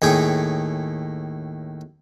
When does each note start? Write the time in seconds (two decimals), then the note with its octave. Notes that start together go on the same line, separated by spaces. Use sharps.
0.02 D#2 A2 G#4 G5